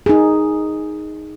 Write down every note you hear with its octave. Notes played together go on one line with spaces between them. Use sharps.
D#4 G#4